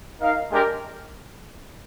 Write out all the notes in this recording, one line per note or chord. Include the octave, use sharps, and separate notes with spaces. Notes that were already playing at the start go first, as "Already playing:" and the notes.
D#4 A#4 F5
G#3 D4 G4 A#4